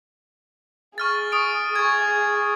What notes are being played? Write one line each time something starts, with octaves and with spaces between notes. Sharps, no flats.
G#4 C#6 F6 A6
C#6 D#6 D7
G#4 C#6 G#6